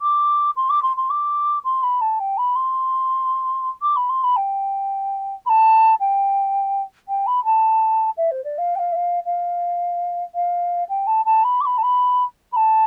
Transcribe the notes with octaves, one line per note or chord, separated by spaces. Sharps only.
D6
C6
D6
C6
C6
D6
C6
B5
A5
G5
B5
C6
D6
B5
C6
B5
G5
B5
A5
G5
G5
B5
A5
E5
C5
D5
F5
G5
F5
E5
F5
F5
F5
G5
A5
A5
B5
D6
B5
A5
B5
B5
A5